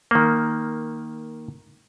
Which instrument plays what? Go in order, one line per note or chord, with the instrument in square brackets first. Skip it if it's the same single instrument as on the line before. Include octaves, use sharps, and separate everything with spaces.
[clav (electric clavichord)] D#3 A#3